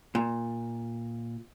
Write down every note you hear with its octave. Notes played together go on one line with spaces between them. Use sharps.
A#2